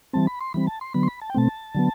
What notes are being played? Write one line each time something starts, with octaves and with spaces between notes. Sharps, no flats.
E3 G3 C4 A5
B5
C6
E3 G3 C4 B5
A5
C6
D3 F#3 B3 B5
C6
B5
A5
G5
B2 A3 C4 A5
D3 F#3 B3